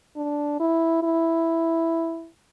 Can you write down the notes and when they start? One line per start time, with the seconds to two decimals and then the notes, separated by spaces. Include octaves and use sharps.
0.16 D4
0.60 E4
1.03 E4